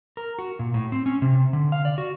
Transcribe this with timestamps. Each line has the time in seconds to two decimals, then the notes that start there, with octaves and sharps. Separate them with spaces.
0.17 A#4
0.39 F#4
0.59 A#2
0.74 A2
0.92 C4
1.06 C#4
1.22 C3
1.53 D3
1.72 F5
1.85 D5
1.98 F#4